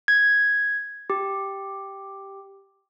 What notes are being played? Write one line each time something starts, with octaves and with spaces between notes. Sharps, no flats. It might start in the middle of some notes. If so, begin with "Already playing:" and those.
G#6
G4